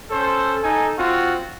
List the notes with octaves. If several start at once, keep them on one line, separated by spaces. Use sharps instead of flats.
C#4 A4 C5
D#4 A4 G#5
C4 F4 F#4